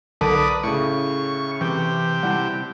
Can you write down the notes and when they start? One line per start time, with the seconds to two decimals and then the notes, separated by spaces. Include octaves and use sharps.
0.21 B1 D3 A#4 B4 D5 A5 D#6
0.63 A2 C#3 C#6
1.61 C3 E3 G4
2.23 G3 E4 F#5 A5